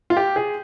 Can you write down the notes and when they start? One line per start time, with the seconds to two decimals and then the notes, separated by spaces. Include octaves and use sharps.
0.10 F4
0.17 G4
0.36 G#4